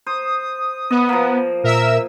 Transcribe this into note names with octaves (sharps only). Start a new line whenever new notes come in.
C5 D#6
B3 D#5
F3 A#3
A#2 A#4 E5 E6